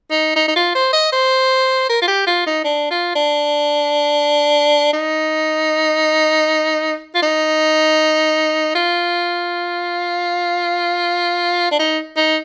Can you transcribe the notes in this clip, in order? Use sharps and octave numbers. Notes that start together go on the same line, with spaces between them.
D#4
D#4
D#4
F4
C5
D#5
C5
A#4
F4
G4
F4
D#4
D4
F4
D4
D#4
F4
D#4
F4
D4
D#4
D#4